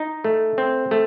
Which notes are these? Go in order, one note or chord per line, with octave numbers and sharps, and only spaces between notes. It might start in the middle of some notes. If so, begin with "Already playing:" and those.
Already playing: D#4
A3
C4
A3